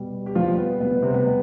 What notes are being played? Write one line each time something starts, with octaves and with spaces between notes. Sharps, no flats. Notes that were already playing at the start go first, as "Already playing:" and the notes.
Already playing: B2 G3
G4
B2 F3 G3 F4
B3
B2 G3 B3
B3
C3 C4
B3
B2 G3